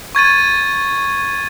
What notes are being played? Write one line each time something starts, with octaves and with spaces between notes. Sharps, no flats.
C#6 G#6 A6 D#7